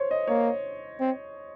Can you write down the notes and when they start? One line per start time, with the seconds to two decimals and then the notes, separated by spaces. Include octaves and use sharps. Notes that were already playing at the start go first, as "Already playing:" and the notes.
Already playing: C5 C#5
0.11 D#5
0.27 A#3 C#5
1.00 C4